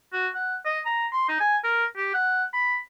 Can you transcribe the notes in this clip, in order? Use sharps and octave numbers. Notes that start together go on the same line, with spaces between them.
F#4
F#5
D#5
A#5
C6
D#4
G#5
A#4
G4
F#5
B5